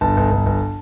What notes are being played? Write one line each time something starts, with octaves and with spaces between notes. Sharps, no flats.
G1 A5
G1
G1
G1